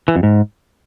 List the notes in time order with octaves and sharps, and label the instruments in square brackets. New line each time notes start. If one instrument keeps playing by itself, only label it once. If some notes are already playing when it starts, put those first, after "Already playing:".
[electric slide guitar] E3
F2
G#2